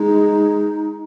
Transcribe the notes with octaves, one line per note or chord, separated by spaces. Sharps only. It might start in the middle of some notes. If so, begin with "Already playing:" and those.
Already playing: G#3 D#4